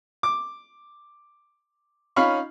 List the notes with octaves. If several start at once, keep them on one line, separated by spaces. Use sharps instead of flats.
D6
C#4 D#4 F4 F5 B5 C#6